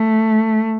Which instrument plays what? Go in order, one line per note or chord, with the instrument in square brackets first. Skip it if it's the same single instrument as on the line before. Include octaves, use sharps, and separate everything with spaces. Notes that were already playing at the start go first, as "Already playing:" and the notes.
Already playing: [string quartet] A3